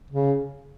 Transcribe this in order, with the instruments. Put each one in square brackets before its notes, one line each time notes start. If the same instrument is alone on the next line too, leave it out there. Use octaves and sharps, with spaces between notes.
[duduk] C#3